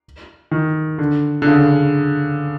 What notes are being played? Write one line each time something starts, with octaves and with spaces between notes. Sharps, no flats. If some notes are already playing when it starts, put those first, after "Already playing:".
D#3
D3
D3
C#3